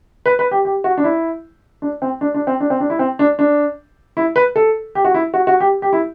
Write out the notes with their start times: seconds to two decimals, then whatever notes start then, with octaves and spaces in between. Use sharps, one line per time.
0.26 B4
0.39 B4
0.51 G4
0.65 G4
0.84 F#4
0.98 D4
1.04 E4
1.82 D4
2.02 C4
2.21 D4
2.34 D4
2.47 C4
2.60 D4
2.70 C4
2.80 D4
2.90 E4
2.99 C4
3.19 D4
3.39 D4
4.17 E4
4.36 B4
4.56 A4
4.95 G4
5.05 F#4
5.14 E4
5.34 F#4
5.47 F#4
5.60 G4
5.82 G4
5.93 E4